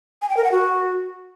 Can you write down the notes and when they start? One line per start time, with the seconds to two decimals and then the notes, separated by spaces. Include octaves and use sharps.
0.22 G#5
0.29 G5
0.37 A#4
0.44 F#5
0.52 F#4